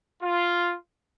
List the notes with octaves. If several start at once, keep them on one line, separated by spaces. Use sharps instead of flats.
F4